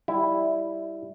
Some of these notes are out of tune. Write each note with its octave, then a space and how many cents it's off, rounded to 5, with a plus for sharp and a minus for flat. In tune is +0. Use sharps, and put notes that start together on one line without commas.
G3 +0 E4 +0